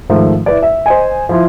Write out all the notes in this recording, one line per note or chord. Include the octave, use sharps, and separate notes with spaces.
G#2 D#3 F3 A3
E4 B4 D5
E5
C5 D#5 G#5
F3 E4 F4